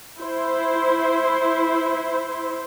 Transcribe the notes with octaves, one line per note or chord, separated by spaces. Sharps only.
E4 C5